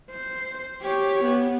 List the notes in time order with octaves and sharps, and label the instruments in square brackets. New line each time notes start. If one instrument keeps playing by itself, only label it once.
[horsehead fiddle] C5
G4 C#5
B3